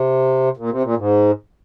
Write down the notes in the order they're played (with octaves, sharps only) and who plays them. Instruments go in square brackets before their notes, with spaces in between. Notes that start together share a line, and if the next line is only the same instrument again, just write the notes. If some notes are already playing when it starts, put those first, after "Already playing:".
Already playing: [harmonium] C3
A#2
C3
A#2
G#2